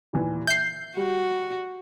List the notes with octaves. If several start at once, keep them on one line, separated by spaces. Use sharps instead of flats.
D#2 A#2 E3
E5 G6 C7
G3 F#4 G4